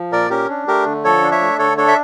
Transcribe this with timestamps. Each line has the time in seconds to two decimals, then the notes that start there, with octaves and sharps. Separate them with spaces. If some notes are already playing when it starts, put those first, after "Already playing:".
Already playing: F3
0.12 A#2 A#4 D5
0.30 C#4 G4 A#4
0.49 D4
0.67 A3 G4 A#4
0.86 D3
1.04 F3 A4 C#5
1.23 D4
1.31 C#5 E5
1.41 A3
1.59 D3 A4 C#5
1.77 D4 A4 C#5
1.88 E5